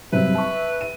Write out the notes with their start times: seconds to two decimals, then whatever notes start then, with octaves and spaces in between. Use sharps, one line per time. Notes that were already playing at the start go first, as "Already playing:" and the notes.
0.12 G2 C3 F#3 B4 E5
0.35 A5 C#6
0.81 D#7